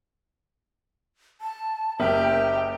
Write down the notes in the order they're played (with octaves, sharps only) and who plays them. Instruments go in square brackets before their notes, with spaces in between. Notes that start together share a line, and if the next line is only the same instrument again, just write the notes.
[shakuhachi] A5
[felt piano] F#1 [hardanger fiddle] G4 [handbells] A#4 E5 [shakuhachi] G5